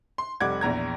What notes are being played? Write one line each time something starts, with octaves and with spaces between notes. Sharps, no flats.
C6
F1 G3 F#5 D6 G#6
A#1 E2 A#5 G#6